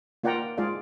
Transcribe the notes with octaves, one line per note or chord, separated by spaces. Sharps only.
A#3 F4 D5 F#5 G5 A#5
G#3 F4 G#4 D5 F5